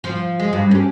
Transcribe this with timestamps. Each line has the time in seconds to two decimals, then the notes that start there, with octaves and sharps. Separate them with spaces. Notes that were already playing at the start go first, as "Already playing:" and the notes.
0.04 F3 F4
0.40 G#3
0.53 G2
0.71 C#4 G4